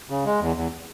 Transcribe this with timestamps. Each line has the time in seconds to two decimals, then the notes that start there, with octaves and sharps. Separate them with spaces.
0.10 C#3
0.26 G#3
0.41 E2
0.56 E2